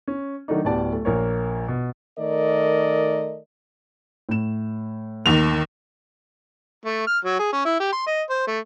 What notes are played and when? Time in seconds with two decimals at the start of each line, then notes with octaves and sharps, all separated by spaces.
0.08 C#4
0.48 D#3 F#3 A3 D4 D#4
0.65 D1 B3 G4 D5 A5
0.92 A3
1.05 A#1 A#3 A#4 C#5
1.68 B2
2.18 D#3 A3 A#4 D5 D#5
4.29 A2 E7
5.26 D#2 D#3 F7
6.85 A3
7.07 F6
7.25 F#3
7.39 G#4
7.53 C#4
7.65 E4
7.80 G4
7.93 C6
8.07 D#5
8.30 C5
8.47 A3